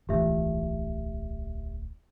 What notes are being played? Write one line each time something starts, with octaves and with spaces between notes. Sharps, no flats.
D1 B1 G#2 E3 F3 A3 G4 E5